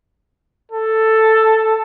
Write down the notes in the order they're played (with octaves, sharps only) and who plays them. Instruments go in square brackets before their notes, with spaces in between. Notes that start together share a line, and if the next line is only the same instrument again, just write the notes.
[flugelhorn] A4